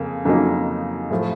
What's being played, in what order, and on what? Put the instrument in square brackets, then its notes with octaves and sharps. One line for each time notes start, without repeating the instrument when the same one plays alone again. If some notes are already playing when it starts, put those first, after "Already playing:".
Already playing: [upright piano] F2 C#3 A#3
F2 C#3 F#3 A#3 D#4
A2 F3 A3